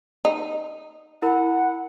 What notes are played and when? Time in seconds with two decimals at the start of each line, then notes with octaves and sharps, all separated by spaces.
0.25 D#4
1.22 E4 A#4 F#5 B5